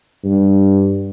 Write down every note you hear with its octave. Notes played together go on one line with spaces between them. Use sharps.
G2